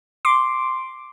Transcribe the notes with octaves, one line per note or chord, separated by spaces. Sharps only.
C6 D6